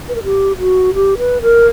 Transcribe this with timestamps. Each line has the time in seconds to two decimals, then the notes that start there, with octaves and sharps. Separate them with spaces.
0.09 B4
0.15 A#4
0.24 G4
0.58 F#4
0.94 G4
1.18 B4
1.42 A#4